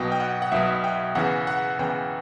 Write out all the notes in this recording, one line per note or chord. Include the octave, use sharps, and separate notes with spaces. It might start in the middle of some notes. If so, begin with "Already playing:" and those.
Already playing: B1 B2 G5
G5
F#5
F#5
B1 B2 E5
G5
E2 C#3 E3 F#5
F#5
E2 C#3 E3 G5